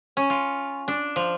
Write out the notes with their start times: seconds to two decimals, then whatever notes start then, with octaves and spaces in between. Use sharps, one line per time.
0.17 C#4
0.30 F4
0.88 D4
1.16 F3